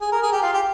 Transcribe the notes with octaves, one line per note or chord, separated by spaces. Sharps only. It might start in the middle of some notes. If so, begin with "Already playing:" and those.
G#4
A#4
G#4
G4
F4
G4